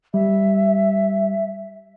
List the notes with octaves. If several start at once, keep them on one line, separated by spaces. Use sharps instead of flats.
G3 E5